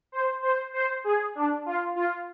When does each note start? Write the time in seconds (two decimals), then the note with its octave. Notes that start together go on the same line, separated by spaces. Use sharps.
0.12 C5
0.43 C5
0.73 C5
1.04 G#4
1.35 D4
1.66 F4
1.96 F4